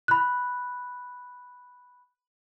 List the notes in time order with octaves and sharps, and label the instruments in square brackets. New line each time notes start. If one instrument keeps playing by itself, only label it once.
[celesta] B5 F#6